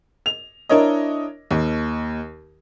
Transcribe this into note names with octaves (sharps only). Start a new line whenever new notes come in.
F7
D4 E4 A#4 C#5 D#5
D#2